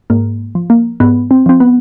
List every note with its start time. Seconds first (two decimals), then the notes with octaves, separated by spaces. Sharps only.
0.10 G#2 A#3
0.55 F3
0.70 A#3
1.00 G#2 B3
1.31 C4
1.46 F3 C4
1.60 B3